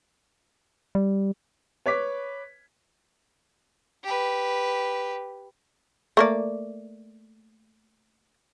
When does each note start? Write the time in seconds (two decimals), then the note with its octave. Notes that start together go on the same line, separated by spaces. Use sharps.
0.95 G3
1.86 B4 C#5 D6 B6
4.04 G4 B4
6.17 A3 A#3 D5